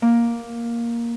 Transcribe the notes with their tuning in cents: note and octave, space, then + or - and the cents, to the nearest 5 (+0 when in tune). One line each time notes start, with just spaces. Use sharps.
A#3 +5